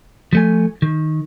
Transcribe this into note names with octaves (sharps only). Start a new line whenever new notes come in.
F3 A3 G#5
D#3